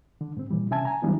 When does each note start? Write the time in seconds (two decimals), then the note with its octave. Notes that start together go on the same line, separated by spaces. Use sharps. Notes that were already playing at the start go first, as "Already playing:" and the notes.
0.21 D3
0.37 G#2 C4
0.51 A#2 E3 G3
0.71 C3 C#4 E5 G#5 A5 G#6
0.85 G#5 A#5
1.02 D#3 F#3 G3 B3 D4 E4